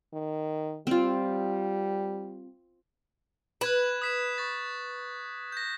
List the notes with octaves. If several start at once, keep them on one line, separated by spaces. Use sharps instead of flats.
D#3
G3 C4 F4
B4 F#6 G#6 E7
D#6 B6 E7
C#6 A6
G6 A#6